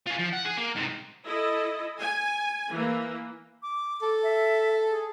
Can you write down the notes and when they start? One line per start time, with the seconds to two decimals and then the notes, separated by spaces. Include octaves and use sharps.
0.06 F4 G#4
0.19 F3
0.33 F#5
0.45 G#4
0.57 A#3
0.75 G#2 C3
1.26 E4 A4 D#5
1.99 G#5
2.70 E3 A#3
3.63 D6
4.02 A4
4.23 E5
4.90 G#4